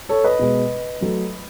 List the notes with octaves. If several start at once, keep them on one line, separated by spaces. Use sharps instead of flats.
A4 C#5
B4 D#5
B2 G#3 B3
F#3 A3